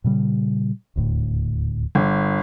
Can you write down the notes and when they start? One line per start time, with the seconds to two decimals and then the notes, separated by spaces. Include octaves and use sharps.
0.04 A#2 C#3 G3
0.96 D#1 D2 A2
1.95 G1